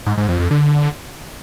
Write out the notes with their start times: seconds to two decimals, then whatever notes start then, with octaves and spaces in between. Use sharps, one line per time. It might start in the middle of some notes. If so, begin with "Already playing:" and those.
0.07 G#2
0.18 G#2
0.29 F2
0.40 F2
0.51 D3